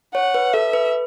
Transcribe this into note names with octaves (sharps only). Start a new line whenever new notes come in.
C#5 F#5
B4
A4 E5
B4